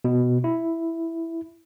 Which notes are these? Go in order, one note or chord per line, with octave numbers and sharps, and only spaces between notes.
B2
E4